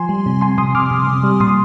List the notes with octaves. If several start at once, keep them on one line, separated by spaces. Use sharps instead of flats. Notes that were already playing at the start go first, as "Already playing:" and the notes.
Already playing: F3 G#5 C6
G3
C3
C3 G#5 C6
C3 C6 D#6
C3 D6 F6
C3
C3
G3
A#2 C6 D#6